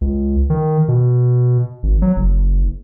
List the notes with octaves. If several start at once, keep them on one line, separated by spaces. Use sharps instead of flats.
C#2
D#3
B2
G#1
F#3
F#1